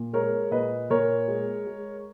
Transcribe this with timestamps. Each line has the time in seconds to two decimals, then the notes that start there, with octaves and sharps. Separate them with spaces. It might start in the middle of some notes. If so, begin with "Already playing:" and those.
Already playing: A#2
0.13 G#3 A#4 C#5
0.51 A#2 B4 D#5
0.90 A#2 A#4 C#5
1.28 G#3
1.67 G#3